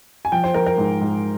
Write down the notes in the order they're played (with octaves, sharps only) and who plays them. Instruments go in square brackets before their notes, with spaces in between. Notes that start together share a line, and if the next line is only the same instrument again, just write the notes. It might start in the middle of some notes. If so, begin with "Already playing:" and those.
[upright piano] G#5
F3 G5
C5
F3 A#4
A#4
G#2
G#2